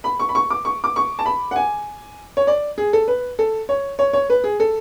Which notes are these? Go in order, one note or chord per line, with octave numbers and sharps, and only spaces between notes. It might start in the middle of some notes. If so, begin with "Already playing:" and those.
B5
C#6
B5
C#6
D6
C#6
D6
C#6
A5
B5
F#5
G#5
C#5
D5
G#4
A4
B4
A4
C#5
C#5
C#5
B4
G#4
A4